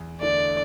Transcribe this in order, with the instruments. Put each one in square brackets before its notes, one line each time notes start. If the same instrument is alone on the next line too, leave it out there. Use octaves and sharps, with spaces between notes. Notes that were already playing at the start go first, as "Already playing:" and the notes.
Already playing: [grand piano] E2
[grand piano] D3 A3 [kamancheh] D5